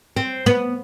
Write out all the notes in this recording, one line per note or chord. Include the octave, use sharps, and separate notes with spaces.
C4
B3